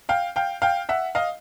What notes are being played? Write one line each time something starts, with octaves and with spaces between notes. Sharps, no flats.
F5 G5
F5 G5
F5 G5
E5 F#5
D#5 F5